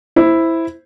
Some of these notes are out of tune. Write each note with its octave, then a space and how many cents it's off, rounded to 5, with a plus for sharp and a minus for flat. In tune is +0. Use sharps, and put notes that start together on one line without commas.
E4 +0 C5 +0